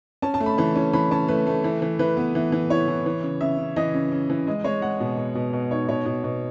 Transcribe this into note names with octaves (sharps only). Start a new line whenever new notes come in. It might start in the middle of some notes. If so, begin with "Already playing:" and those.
C#4 A5
A5
A3
B5
E3 A5
C#4
E3 B5
C#4 A5
A3 B4
A3
E3
E3
E3 B4
B3
E3
E3
E4 C#5
E3
E3
C#3
C#3 E5
C#3
E3 D#5
C#3
C#3
E3
G#3 D#5
G#3 C#5
G#3 F#5
B2
B2
B2
B2
D#4 C#5
B2 C#5
B2
B2